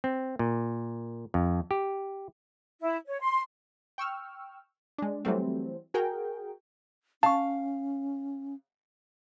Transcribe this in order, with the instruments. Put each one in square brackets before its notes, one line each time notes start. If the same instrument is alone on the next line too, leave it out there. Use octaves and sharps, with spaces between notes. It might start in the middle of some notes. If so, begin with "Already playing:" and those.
[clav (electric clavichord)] C4
A#2
F2
G4
[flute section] E4
C#5
C6
[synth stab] G5 C#6 E6 F6
G#3 D4
E3 F#3 G3 A3 C4
F#4 G#4 A#4 G5
[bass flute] C#4 [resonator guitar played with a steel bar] F5 [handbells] A5 C#6